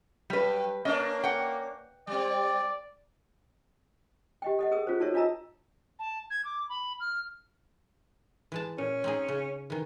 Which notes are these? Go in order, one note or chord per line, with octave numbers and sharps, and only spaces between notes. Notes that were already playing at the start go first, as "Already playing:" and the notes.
G2 F#3 G3 B4
A#3 C#4 D4 D#5
F#5 G5
G3 C4 D5
G4 D#5 G5
A4 D#5 F#5
G#4 A#4 D#6
C#4 F4 G#4 C5
D#4 F#4 A4 A#4 C#5 E5
D4 F4 D#5 A5 A#5 E6
A5
G#6
D6
B5
F6
E3 G#3 A5
A#2 C#4
C4 D#4 G#4
C#3
D#3 E3